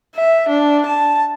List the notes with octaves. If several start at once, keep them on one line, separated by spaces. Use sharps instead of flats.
E5
D4
A5